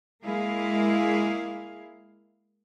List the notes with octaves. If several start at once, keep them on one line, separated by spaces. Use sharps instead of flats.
G#3 A#3 E4 G#4 F5